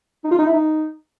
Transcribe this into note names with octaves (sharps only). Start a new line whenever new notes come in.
D#4
F4
D#4
E4
D#4